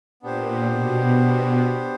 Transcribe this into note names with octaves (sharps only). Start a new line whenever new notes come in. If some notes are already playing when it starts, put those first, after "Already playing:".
A#2 B3 D4 G4 C5
B2
B2